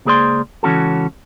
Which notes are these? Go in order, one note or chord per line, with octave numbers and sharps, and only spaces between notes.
C#2 A#3 G#4 C5 D5 C6
C#2 E3 C#4 F#4 A4